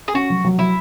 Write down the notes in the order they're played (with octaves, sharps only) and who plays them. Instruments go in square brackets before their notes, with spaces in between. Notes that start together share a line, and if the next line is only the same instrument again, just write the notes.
[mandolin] G#4
[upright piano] C#4 [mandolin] F#4
[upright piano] F#3
F#3
[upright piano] F#3 [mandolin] E4